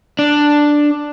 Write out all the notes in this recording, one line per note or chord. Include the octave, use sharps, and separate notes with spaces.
D4